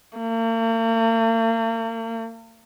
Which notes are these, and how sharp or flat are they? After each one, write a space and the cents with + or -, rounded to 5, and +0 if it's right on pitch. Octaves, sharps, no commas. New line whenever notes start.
A#3 -45